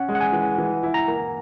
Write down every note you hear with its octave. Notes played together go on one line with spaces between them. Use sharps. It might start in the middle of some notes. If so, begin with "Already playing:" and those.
Already playing: C#4 F#5
G#3
F#5
G#5
E3
E3
E4
A#5
A#3